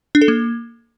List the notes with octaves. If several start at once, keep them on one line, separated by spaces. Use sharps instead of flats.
D4
A4
A#3